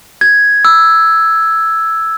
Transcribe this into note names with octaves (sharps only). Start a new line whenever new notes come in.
G#6
E6